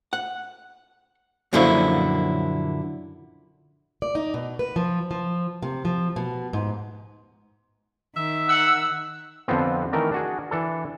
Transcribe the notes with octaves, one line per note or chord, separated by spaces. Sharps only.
F#5
F#2 A#2 D3 F3 C#4 E4
D5
D#4
B2
B4
F3
F3
C3
F3
B2
G#2
D#3 E5
F#5 E6
F2 D3 F3 B3 C4
D#3 E3 A3 A#4 D5
D4 F#4 G#4
E3 D4 A4